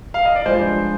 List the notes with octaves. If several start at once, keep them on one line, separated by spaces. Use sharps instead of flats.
F5
D#5
D5
G2 F3 G#3 C5